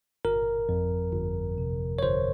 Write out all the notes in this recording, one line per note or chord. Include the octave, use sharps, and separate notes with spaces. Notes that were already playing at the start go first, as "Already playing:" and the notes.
G1 A#4
F2
G1
C3
C#5
G1 C5